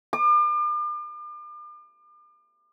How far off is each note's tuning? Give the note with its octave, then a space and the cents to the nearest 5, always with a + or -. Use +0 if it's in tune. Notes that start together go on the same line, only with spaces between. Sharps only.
D6 +40